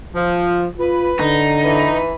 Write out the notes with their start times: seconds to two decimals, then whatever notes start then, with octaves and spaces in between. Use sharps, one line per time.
0.15 F3
0.78 F4 B4
1.19 D3 D#4
1.65 E3 B4